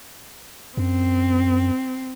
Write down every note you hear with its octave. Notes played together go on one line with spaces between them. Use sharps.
F#2 C4